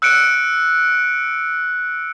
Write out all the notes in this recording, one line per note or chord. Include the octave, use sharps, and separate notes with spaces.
E6 F#6 C#7 D7